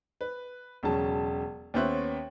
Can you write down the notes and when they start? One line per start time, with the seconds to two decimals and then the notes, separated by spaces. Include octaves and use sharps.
0.21 B4
0.83 E1 C#3 F#3 A5
1.74 D#2 B3 C#4 C5 E5 F#6